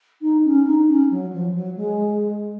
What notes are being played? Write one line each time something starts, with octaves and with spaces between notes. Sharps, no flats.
D#4
C#4
D#4
C#4
F#3
F3
F#3
G#3